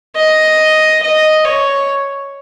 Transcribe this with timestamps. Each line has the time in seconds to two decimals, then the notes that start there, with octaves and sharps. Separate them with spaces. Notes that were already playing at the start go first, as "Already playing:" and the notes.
0.16 D#5
1.03 D#5
1.45 C#5